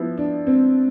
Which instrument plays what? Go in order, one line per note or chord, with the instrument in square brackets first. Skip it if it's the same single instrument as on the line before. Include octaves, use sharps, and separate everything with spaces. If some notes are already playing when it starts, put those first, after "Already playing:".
Already playing: [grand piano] F3 B3 [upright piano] E4
[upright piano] D4
C4